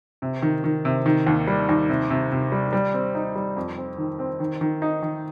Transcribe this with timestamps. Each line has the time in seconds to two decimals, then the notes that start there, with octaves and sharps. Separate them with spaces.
0.22 C3
0.42 D#3
0.64 D#3
0.85 C3
1.06 D#3
1.27 D#2
1.47 G3
1.69 D#2
1.89 C3
2.10 C3
2.32 C3
2.52 G3
2.73 G3
2.94 C4
3.15 D#4
3.35 G3
3.57 F2
3.77 C4
3.98 D#3
4.19 C4
4.40 D#3
4.61 D#3
4.82 D#4
5.03 D#3